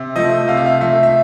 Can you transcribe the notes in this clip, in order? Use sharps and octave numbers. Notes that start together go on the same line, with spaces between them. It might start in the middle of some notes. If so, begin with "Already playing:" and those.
Already playing: C3
F3 A3 D#5
C3 F5
E5
F5
F3 A3 E5
E5